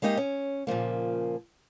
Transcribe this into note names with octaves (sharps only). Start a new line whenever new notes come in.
G#3 A#3 D#4 G4 D#5
C#4
A#2 C#3 F3 A#3